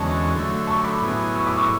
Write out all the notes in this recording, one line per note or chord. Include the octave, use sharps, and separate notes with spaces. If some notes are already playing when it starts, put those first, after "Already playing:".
Already playing: E2 D3 G#3 C#4 F#4 A5 C#6
D3 F#3 A3
A5 C#6
B5 D6
A2 F#3 B3 E4 G#4
C#6 E6
B5 D6
C#6 E6